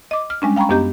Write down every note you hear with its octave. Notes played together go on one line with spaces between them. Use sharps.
D#5 D6
F6
G3 G#3 C#4 D4
F5 G5 A#5 B5 C#6
F#2 B3 D4 G4 D#5 G6